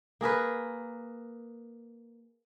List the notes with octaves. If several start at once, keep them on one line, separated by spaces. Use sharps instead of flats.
A#3 G#4 A#4 B4